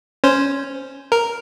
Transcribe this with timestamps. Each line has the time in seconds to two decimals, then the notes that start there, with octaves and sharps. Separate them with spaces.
0.24 C#4 C5
1.12 A#4